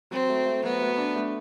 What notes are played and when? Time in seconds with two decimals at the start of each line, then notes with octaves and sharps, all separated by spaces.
0.11 F#3 C4
0.30 A3
0.46 A3
0.63 F#3 B3
0.82 A3
0.98 D4
1.16 A3